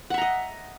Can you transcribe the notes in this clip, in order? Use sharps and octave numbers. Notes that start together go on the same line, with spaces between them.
D#5 E5 F#5 A#5